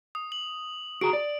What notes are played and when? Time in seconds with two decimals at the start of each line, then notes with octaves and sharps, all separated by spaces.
0.15 D#6
0.32 F#7
1.01 F#4 G#4 A#5 D7
1.13 D5